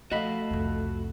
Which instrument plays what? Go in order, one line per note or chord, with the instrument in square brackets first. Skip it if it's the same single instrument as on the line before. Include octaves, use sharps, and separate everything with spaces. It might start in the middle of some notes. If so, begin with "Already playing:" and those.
[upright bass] F3 [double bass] A3 [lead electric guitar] F#4 B5 [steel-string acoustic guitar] D#5 F5
[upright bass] C2 F2